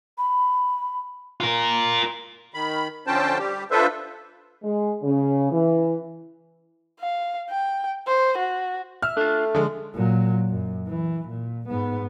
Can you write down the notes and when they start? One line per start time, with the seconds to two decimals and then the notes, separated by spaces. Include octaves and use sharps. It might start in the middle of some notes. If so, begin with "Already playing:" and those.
0.18 B5
1.41 F4 A#4
2.54 D#3 B5
3.07 D3 F3 C#4 C5 G5 A5
3.39 G3 G4
3.71 D4 F4 A4 B4 C5 E5
4.63 G#3
5.03 C#3
5.52 E3
7.00 F5
7.50 G5
8.07 C5
8.38 F#4
9.02 E5 F6
9.17 A3 D4 F4
9.55 D3 F3 G#3
9.94 A#2 F#3
10.50 F#2
10.87 E3
11.29 A#2
11.69 G#2 B3